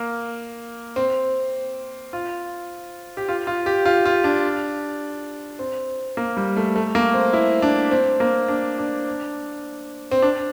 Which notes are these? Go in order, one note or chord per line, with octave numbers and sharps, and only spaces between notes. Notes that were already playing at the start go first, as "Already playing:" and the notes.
Already playing: A#3
C4
F4
G4
F4
F4
G4
F4
F4
D4
C4
A#3
G3
A3
A3
A#3
C4
E4
D4
C4
A#3
D4
D4
C4
D4